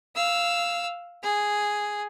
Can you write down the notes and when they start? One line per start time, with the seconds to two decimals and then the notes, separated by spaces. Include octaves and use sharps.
0.16 F5 E6
1.23 G#4